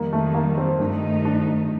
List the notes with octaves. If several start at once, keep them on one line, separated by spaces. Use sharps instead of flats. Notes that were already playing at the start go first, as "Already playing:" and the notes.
Already playing: F2 D#3 G3 A#3
A3
A#3
C4
G2 D#3 A3 D4 D#4
D4